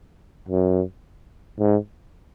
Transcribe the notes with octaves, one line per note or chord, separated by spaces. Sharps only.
F#2
G#2